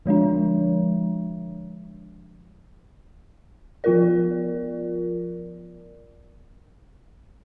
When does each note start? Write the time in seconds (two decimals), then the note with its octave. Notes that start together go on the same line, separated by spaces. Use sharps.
0.06 D3 F3 G#3 D4
3.84 F3 B3 F4 A#4 D5